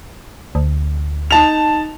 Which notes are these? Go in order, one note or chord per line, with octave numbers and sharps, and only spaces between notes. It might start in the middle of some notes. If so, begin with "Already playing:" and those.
D2
D#4 A5 F7